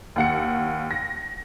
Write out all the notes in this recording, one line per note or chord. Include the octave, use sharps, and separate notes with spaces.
D#2 F#5 C#7
A#6